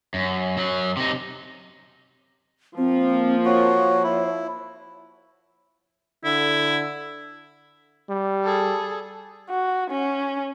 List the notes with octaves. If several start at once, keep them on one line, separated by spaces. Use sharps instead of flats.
F#2
F#2 F#3
C3 D#4
F3 A#3 C4
F#4 C#5
E4
D3 E4
G3
G#4 A4
F#4
C#4